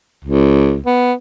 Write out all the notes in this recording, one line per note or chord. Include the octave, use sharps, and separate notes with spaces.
C#2
B3